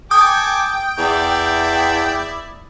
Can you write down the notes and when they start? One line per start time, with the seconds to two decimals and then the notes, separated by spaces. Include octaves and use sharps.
0.11 A4 G5 G#5 D6 D#6
0.98 E2 E4 D5